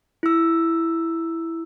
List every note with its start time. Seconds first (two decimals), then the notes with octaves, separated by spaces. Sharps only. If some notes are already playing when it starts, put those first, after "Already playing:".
0.23 E4 E6